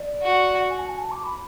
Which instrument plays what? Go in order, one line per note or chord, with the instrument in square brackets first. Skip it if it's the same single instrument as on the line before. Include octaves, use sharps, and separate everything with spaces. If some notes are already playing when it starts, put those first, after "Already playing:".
Already playing: [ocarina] D5
[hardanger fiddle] F#4
[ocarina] G#5
A5
G#5
A5
D6
B5